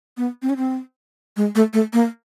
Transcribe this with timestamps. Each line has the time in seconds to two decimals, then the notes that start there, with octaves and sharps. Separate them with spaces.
0.17 B3
0.42 C4
0.50 C#4
0.57 C4
1.37 G#3
1.55 A3
1.73 A3
1.93 A#3